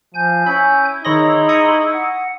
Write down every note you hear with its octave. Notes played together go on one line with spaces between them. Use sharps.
F3 G#5 G6
C#4 E4 B5
D#3 D#4 G#4 C#5 B5 C6 A#6
A#5 C#6 D#6
F#5